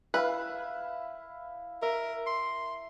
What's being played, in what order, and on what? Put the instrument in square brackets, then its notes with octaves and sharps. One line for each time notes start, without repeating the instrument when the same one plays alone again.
[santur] E4 E5 F5 [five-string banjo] B4
[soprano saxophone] A#4 [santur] E5
[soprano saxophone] C6